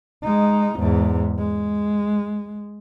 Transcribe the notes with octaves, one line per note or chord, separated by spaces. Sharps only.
G#3 D#4
E2 G#2
G#3